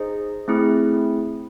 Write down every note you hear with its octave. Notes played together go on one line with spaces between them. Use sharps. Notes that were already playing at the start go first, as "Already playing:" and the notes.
Already playing: D#4 G#4 C5 D#5
A3 C4 E4 G#4